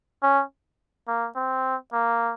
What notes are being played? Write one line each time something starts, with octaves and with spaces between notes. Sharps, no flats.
C#4
A#3
C4
A#3